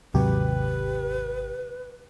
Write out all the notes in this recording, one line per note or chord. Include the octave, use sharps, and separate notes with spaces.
G#1 D#2 C3 F#3 G4 B4